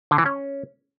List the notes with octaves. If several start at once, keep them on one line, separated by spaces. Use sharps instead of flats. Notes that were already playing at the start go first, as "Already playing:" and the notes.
D3
E3
C#4